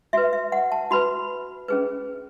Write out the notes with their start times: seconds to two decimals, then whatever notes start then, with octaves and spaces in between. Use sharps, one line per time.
0.13 F#4 B4 E5
0.33 E5
0.52 F#5
0.72 A5
0.91 F#4 B4 B5
1.68 C#4 G#4 B4